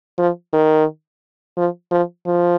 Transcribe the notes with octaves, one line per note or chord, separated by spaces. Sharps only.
F3
D#3
F3
F3
F3